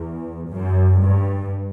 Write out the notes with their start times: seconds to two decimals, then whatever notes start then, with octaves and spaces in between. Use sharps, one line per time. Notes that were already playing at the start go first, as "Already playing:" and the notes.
Already playing: E2
0.50 F#2
1.01 G2